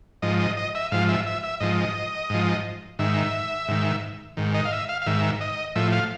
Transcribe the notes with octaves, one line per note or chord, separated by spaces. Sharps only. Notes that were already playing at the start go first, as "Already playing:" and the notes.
G#2 F3 D#5
D#5
D#5
E5
G#2 F3 F5
E5
E5
E5
G#2 F3 D#5
G#2 F3
G#2 D#3 E5
G#2 D#3
G#2 D#3
D#5
F5
E5
F5
F5
G#2 D#3 E5
D#5
A2 F3 E5
F5